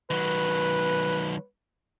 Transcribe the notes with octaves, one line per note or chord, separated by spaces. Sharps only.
D#3 F#3 B4